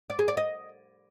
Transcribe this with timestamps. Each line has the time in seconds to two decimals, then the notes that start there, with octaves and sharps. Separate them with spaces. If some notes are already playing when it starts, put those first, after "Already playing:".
0.10 D5
0.19 G#4
0.28 D5
0.37 D#5